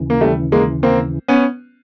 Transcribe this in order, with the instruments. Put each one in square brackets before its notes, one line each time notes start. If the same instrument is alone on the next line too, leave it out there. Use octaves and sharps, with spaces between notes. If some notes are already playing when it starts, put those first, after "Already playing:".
Already playing: [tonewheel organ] D#2 C#3 E3
[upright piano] A#3
G3 A3
G#3 A#3
A#3 C4
B3 C#4